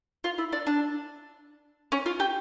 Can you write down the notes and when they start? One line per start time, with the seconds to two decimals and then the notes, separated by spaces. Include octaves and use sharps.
0.24 F4
0.38 E4
0.53 D4
0.67 D4
1.92 C#4
2.06 F4
2.20 G4